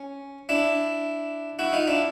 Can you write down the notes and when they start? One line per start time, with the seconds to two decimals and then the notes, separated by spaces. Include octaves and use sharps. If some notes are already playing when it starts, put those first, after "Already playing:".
Already playing: C#4
0.49 D4 E4
1.59 E4 F#4
1.73 D#4 F4
1.87 D4 E4